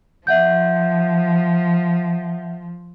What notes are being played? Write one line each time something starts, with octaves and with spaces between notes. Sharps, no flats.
F3 E5 F#5 G6